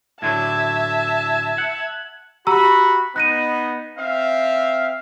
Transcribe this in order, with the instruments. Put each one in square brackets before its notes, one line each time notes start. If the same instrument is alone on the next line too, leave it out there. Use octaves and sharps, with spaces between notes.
[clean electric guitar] A2 D3 F#3 [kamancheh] E5 A5 [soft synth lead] G#6
[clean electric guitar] F#5
[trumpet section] F#4 B5 [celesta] G4 A#5 E6
[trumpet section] B3 D#4 [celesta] F#6 A#6 D#7
[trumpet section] C4 E5 F5